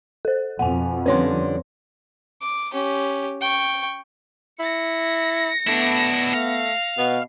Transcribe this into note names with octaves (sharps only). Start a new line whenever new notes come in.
A4 C5
F2 B2 F#5 G#5
D3 G3 C#4 B4 C#5 C6
D6
C#4 G4
G5 C#6
E4 A#6 C#7
A3 B3 D4 E4
A3 F5
B2 B3